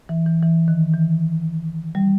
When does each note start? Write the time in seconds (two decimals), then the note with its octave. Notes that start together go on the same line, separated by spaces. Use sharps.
0.09 E3
0.26 E3
0.43 E3
0.68 D#3
0.94 E3
1.95 G3